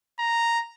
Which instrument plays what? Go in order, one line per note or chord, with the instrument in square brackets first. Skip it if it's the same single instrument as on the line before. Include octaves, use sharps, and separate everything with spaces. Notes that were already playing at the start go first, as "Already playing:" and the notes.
[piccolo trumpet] A#5